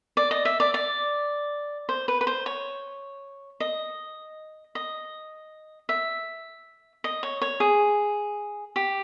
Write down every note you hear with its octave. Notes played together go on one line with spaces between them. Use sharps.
D5
D#5
E5
D5
D5
C5
B4
B4
C5
C#5
D#5
D#5
E5
D#5
C#5
C#5
G#4
G4